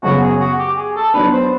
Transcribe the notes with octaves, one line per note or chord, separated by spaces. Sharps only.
F#2 C#3 F#3 B3 F#4
G#4
F#4
G4
G#4
A4
F#3 B3 D4 B4
C5